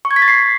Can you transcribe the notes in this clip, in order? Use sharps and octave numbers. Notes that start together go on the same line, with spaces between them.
C#6
G#6
B6
A6
C7